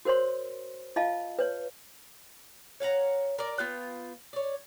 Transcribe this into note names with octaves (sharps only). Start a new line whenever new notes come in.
F#4 A#4 C5 C#5 C6
F4 D#5 F5 A5
B4 C#5
C#5 F5 F#5 A#5
A#4 D5
B3 F4 G5
C#5 D5